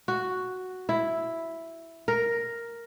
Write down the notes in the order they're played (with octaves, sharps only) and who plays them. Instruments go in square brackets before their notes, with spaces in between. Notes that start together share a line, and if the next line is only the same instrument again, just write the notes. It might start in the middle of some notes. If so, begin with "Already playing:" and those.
[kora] F#4
E4
A#4